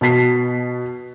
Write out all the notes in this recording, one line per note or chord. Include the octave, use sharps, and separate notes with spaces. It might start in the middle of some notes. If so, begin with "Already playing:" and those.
B2 A5 B6 C7